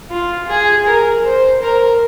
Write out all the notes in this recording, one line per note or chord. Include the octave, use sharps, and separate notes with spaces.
F4
G#4
A#4
C5
A#4